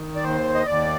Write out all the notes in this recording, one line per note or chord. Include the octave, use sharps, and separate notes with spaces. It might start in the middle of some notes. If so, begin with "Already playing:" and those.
Already playing: D#3
D5
D#2 C5
D#5
D#2 D5